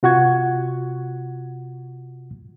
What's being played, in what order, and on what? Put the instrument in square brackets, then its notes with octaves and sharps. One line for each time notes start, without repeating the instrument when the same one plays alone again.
[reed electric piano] C3 F4 F#4 F#5 C#6 G#6